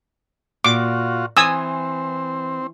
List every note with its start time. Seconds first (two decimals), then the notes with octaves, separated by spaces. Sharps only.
0.65 A#2 F4 F#4 D6
1.37 E3 C4 G#5 D#6 E6